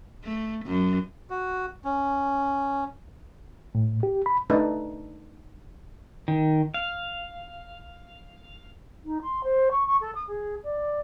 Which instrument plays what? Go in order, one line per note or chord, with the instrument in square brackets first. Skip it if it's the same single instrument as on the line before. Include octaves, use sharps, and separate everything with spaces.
[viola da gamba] A3
F#2
[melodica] F#4
C#4
[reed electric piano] A2
G4
B5
[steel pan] A3 D4 D#4 A4 B4
[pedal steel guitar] D#3
F5
[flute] D#4
C6
C5
C#6
C#6
A4
D#6
G#4
D5